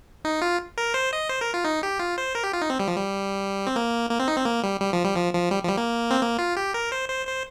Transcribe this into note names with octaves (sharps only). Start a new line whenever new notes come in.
D#4
F4
A#4
C5
D#5
C5
A#4
F4
D#4
G4
F4
C5
A#4
G4
F4
D#4
C4
G3
F3
G3
C4
A#3
A#3
C4
D#4
C4
A#3
G3
G3
F3
G3
F3
F3
G3
F3
G3
A#3
C4
A#3
F4
G4
A#4
C5
C5
C5